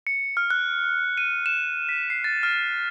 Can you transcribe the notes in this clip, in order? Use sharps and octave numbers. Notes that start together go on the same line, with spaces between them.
C#7
F6
F#6
D#7
E7
B6
C7
A6
F6